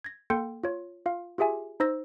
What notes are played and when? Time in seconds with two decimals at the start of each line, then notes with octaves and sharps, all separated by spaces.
0.04 G#6 A#6
0.30 A#3 A4 G5 C6 G6 C#7
0.64 F4 C#5
1.06 F4 F5
1.38 F4 G4 G#4 E5 G#5
1.80 D#4 C5 E6 A#6